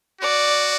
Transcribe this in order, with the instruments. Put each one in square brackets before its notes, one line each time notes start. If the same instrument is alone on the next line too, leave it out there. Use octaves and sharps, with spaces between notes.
[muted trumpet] F#4 [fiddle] D5